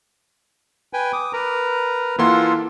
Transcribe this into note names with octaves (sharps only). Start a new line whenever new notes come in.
B4 G5 G#5
D6 D#6
A#4 B4 A#5
E3 A#3 F4 A4 F#5 C6